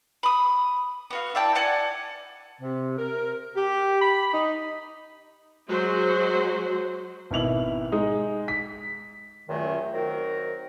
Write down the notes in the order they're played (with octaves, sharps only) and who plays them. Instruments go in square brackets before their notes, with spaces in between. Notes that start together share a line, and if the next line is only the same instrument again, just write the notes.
[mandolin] B5 D#6
B3 F#4 F5
E4 D5 G5 A5
D5 F#5 G#5 A5
[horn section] C3
A#4
G4
B5
D#4
[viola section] F#3 G#3 F#4 C5
[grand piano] G#1 B2 E4 F7 F#7
G#3 D#4
B6
[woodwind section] C#2 F#2 A#2 D#3 F#3 A3
D#3 F#3 C4 F#4 A#4